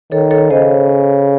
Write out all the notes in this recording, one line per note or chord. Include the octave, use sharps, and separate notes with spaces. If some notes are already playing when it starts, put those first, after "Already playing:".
D#3 A4 C#5
A4 C#5
C#3 C5 D#5